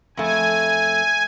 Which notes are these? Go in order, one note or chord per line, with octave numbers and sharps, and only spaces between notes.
F2 A3 G#5